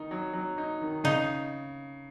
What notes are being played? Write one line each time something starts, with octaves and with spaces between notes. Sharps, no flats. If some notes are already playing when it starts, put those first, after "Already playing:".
Already playing: D#3 D#4
F#3
F#3
D#4
D#3
C#3 D#4